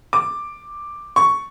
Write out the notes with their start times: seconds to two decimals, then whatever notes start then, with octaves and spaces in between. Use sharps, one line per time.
0.13 D6
1.16 C#6